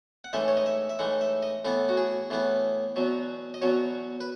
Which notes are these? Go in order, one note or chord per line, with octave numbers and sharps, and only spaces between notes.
F#5
A2 E3 G#3 D#4 E5
C#5
D#5
E5
E5
A2 E3 G#3 D#4 F#5
E5
D#5
A2 E3 B3 E4 A4
F#4
G#4
A2 E3 B3 E4
E2 B2 F#3
D#5
E2 B2 F#3 C#5
B4